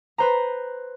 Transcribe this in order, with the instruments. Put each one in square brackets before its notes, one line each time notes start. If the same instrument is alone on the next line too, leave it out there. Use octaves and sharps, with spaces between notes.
[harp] B4 C5 A#5